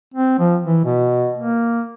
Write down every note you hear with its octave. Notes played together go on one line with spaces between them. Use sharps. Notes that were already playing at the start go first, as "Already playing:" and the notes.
C4
F3
E3
B2
A#3